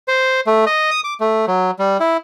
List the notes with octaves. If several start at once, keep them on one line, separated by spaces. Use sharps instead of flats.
C5
A3
D#5
D#6
D6
A3
F#3
G3
E4